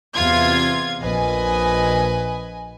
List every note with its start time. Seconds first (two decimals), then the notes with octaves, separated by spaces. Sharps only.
0.16 E2 C3 F4 G#6
1.01 A#1 B4 D#5 G#5